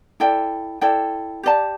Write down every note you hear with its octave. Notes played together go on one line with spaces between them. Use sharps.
E4 A4 D5 G5
E4 A4 D5 G5
G4 D5 A5